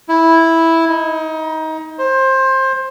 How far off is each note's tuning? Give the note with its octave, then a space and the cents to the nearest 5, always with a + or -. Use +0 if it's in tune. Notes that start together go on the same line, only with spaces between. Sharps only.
E4 -5
D#4 +25
C5 +20